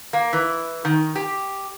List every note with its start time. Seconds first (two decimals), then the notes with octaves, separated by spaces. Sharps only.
0.13 A#3
0.33 E3
0.85 D#3
1.16 G4